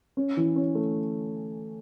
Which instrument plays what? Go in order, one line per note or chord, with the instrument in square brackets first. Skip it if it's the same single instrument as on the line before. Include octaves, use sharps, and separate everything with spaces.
[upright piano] C#4
E3
C#4
A3